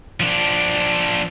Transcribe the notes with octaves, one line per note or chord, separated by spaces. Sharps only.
F3 D4